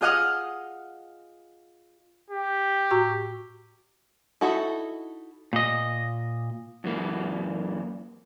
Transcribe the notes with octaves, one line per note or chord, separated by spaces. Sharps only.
F4 G#4 D#5 F#5 D#6 F6
G4
A2 F#4 C#6
D#4 E4 F#4 A4
A#2 D#5
F#2 E3 A#3